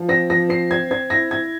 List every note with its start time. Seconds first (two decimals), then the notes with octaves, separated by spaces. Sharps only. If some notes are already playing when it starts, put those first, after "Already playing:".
Already playing: F3
0.09 C4 A#6
0.30 F3 A#6
0.49 C4 C7
0.71 C4 G#6
0.91 C4 G#6
1.10 E4 A#6
1.31 E4 G#6